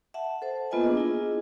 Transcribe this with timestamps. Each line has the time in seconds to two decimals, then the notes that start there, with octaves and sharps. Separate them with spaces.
0.14 E5 F#5 A5
0.42 A4 C5
0.71 A#3 B3 F4 B4 D#5 G#5
0.84 D4 G#4 D#5
0.97 E4 G#4